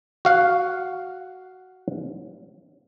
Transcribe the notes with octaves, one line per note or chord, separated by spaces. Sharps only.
F#4 F5 F#5